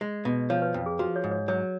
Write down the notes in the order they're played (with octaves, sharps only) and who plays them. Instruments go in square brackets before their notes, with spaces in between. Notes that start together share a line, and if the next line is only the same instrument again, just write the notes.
[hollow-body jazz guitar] G#3
B2
[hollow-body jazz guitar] F3 [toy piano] C#5
[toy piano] B4
[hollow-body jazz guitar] F2
[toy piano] G#4
[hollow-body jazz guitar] F3 [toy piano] F#4
[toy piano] C#5
[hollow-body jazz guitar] G#2
[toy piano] C#5
[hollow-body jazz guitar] F#3 [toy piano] C#5